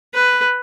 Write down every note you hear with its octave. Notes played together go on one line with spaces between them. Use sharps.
B4